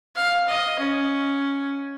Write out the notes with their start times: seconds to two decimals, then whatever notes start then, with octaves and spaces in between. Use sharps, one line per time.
0.16 F5
0.48 D#5
0.79 C#4